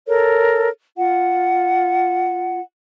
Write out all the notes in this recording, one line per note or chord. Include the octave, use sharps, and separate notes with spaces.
A4 A#4 C#5
F4 F#5